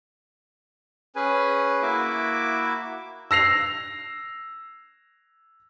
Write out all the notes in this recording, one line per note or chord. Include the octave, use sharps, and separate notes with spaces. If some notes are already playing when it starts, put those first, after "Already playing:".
C#4 G#4 B4 G#5
A#3 E4 F#4 E5 D6
E6 A#6 C7 F7